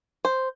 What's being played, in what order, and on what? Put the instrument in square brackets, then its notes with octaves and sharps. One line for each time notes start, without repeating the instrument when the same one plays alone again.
[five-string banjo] C5